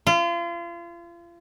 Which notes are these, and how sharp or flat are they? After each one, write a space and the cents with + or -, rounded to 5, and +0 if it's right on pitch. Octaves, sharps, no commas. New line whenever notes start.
F4 -35